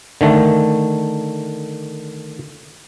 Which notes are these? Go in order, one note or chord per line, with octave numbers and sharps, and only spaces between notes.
D3 D#3 A3